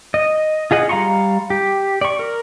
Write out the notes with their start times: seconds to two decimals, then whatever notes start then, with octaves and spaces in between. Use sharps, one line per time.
0.14 D#5
0.71 F4 G#4 D#5 F#5
0.89 G3 F5 A#5 C6 C#6
1.50 G4
2.01 D5 C#6
2.19 A#4